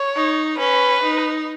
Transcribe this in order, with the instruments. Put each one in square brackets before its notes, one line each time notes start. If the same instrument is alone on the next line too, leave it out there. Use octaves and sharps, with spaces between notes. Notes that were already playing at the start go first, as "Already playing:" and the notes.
Already playing: [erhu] C#5
[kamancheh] D#4
[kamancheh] C#4 [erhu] B4
[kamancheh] D#4